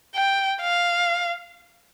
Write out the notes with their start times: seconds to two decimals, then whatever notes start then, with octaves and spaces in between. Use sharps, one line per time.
0.15 G5
0.61 F5